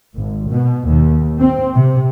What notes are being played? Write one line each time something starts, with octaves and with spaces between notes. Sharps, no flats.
G#1
B2
D#2
C4
C3